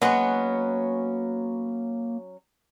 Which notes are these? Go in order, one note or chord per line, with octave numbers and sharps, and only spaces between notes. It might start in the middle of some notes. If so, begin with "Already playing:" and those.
F#3 G#3 A#3 B3 C#4